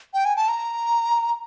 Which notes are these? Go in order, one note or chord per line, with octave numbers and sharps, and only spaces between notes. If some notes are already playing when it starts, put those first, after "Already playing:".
G5
G#5
A5
A#5